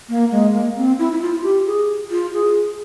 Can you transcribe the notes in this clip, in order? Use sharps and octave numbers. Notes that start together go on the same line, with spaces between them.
A#3
G#3
A#3
C4
E4
E4
F4
G4
G#4
F4
G#4